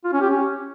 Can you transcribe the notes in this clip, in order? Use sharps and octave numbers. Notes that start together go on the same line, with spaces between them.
F4
C#4
G4
C#4